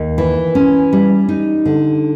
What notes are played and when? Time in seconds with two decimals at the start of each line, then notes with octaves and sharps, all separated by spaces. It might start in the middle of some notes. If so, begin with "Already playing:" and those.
Already playing: D#2
0.18 E3
0.55 C#4
0.93 G3
1.29 D#4
1.66 D3